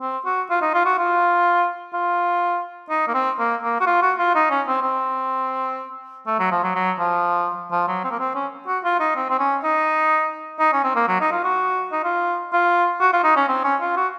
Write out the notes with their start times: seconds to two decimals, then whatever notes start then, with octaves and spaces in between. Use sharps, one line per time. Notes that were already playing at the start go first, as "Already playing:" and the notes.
0.01 C4
0.25 F#4
0.50 F4
0.62 D#4
0.74 F4
0.85 F#4
0.99 F4
1.94 F4
2.90 D#4
3.08 A#3
3.14 C4
3.39 A#3
3.63 A#3
3.80 F#4
3.87 F4
4.02 F#4
4.19 F4
4.35 D#4
4.50 C#4
4.67 C4
4.82 C4
6.27 A3
6.39 F#3
6.51 F3
6.64 F#3
6.75 F#3
6.99 F3
7.72 F3
7.88 F#3
8.04 C4
8.11 A#3
8.20 C4
8.35 C#4
8.68 F#4
8.84 F4
9.00 D#4
9.16 C4
9.30 C4
9.39 C#4
9.63 D#4
10.60 D#4
10.73 C#4
10.84 C4
10.96 A#3
11.08 F#3
11.21 D#4
11.32 F4
11.44 F#4
11.92 D#4
12.04 F4
12.53 F4
13.00 F#4
13.13 F4
13.24 D#4
13.36 C#4
13.48 C4
13.64 C#4
13.81 F4
13.97 F#4